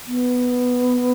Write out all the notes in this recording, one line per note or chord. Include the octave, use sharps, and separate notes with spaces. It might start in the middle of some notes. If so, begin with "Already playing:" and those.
B3